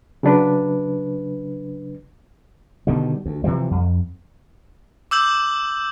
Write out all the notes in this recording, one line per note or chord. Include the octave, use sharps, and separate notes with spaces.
C#3 F#3 D4 B4
B2 D3 D#3 G3
D2
C3 E3 F3 G3
F2
D6 E6 G6 F#7